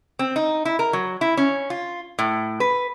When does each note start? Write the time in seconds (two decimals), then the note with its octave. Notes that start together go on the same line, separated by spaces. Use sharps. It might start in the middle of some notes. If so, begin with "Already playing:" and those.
0.19 C4
0.36 D#4
0.65 E4
0.79 A#4
0.93 F#3
1.21 E4
1.37 C#4
1.70 F4
2.19 A2
2.60 B4